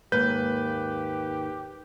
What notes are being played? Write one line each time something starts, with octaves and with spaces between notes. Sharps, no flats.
D#2 G#2 A#3 G4 B4 G6